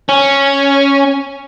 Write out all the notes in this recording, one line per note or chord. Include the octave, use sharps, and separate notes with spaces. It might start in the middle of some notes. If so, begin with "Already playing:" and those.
C#4